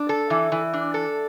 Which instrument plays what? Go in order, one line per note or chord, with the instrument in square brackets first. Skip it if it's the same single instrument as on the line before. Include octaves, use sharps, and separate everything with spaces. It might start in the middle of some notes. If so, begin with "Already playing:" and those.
Already playing: [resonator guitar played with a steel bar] D4
A4
E3
E3
D4
A4